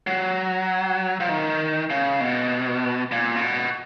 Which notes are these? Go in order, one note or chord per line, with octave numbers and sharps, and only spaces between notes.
F#3
F3
D#3
C#3
B2
A#2
C#3
B2